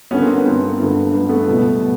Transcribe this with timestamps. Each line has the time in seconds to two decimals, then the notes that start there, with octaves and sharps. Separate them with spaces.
0.11 G1 G2 D3 B3 C#4
0.22 A#3 C4
0.33 B3 C#4
0.45 G1 G2 D3 A#3 C4
0.79 G1 G2 D3
1.13 G1 G2 D3
1.29 A3 B3
1.47 C#2 B2 G3
1.81 B2